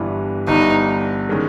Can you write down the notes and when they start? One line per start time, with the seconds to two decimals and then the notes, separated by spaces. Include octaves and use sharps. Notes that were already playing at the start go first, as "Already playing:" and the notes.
Already playing: G1 G2 E3
0.47 G1 G2 E3 D#4
1.29 D#3 G#3 C#4